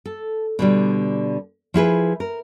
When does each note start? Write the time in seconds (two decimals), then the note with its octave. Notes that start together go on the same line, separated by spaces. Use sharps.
0.06 A4
0.59 B2 D3 G3
1.74 F3 E4 G#4 B4
2.20 A#4